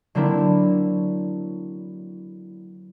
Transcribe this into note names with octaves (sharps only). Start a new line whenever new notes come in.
D3 F#3 A#3 C4 D4 E4